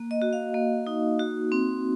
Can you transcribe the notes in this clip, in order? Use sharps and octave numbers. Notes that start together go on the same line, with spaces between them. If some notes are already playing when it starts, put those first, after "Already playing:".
Already playing: A#3
D#5
F#4
F5
A#3
D#4
F#4
C4